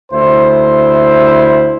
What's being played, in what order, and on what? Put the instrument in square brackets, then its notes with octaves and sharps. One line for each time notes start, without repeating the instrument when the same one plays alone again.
[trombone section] D2 E4 C5